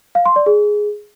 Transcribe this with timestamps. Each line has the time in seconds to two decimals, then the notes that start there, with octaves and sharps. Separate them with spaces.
0.15 F5
0.26 C6
0.36 D5
0.46 G#4